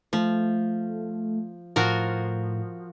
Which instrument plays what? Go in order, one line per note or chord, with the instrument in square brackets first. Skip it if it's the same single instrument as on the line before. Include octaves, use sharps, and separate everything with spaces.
[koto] F3 [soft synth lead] A3
[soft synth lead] A2 [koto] F3 F#4 A#4